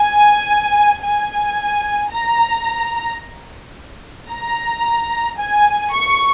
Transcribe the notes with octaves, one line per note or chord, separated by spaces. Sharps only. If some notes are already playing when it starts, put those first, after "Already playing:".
Already playing: G#5
G#5
A#5
A#5
G#5
C#6